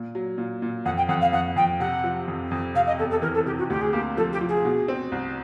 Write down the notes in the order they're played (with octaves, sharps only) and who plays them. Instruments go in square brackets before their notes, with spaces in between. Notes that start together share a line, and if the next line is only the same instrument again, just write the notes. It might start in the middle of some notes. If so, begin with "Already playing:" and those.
Already playing: [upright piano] A#2
F#3
A#2
A#2
[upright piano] F2 [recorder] F#5
[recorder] G5
[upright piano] F2 [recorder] F#5
[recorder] F5
[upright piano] F2 [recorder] F#5
[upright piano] F2 [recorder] G5
[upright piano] C3 [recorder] F#5
[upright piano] F3
F2
F2
[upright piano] C3 [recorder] F5
[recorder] D#5
[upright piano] E2 [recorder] A4
[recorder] A4
[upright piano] E3 [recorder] A#4
[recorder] A4
[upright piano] C3 [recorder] G4
[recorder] F#4
[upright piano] D2 [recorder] G4
[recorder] G#4
[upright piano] A#3 [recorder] G4
[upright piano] F3 [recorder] A4
[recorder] G4
[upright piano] F3
[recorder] G#4
[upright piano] B2
C4
C2